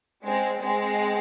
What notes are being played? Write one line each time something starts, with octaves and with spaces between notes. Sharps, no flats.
G#3 C4
G#3 C4